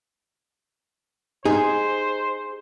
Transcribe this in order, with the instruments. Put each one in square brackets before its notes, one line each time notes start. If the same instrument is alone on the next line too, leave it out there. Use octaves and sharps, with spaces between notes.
[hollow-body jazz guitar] D#4 [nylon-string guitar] G#4 [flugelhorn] C5